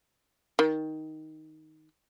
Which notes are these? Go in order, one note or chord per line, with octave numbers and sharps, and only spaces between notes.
D#3